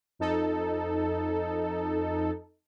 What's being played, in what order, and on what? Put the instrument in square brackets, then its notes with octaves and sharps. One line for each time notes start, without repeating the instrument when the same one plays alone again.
[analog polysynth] F2 D#4 A4